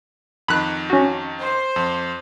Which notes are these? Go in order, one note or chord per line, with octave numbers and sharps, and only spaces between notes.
F2 D#3 B5 F#6
C#4 F#4
C5
F2